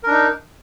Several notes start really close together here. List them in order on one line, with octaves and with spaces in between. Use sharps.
A#4 D4 D#4